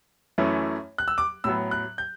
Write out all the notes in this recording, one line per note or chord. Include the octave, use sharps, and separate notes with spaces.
F#2 E3 A3 C#4
F#6
E6
D6
A2 F#3 B3 E6
F#6
G6